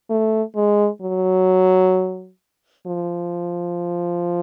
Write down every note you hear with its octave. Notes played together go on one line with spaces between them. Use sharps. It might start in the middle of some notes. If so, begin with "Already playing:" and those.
A3
G#3
F#3
F3